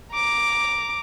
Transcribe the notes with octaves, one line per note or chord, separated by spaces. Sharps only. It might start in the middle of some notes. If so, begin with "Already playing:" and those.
A#5 D6